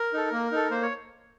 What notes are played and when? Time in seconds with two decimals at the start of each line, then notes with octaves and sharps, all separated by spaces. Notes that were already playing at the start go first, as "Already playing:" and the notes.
Already playing: A#4
0.14 D#4 A4
0.32 A#3
0.51 D#4 A4
0.71 A#3 C5
0.82 C#5